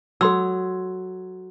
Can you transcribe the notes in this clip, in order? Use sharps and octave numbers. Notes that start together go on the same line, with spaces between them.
F#3 A4 C6 E6